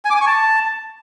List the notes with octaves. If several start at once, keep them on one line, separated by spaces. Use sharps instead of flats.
G#5
D6
G#5
C#6
A5